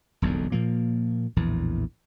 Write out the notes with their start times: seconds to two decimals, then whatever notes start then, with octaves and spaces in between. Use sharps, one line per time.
0.22 E1 B1 F2 D3
0.52 A#2 F3 A#3
1.36 A#1 E2 A2 E3